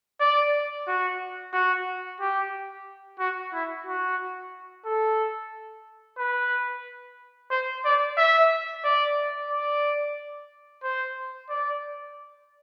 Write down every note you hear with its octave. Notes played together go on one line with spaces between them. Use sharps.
D5
F#4
F#4
G4
F#4
E4
F#4
A4
B4
C5
D5
E5
D5
D5
C5
D5